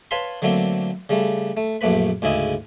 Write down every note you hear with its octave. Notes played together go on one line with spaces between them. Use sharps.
B4 C#5 F5 A5 B5 C6
D3 F#3 A3 A#3 C4
C#3 G3 A3
A3
A#1 F#2 A3 A#3 B4 B5
D2 G#2 C#3 E4 D#5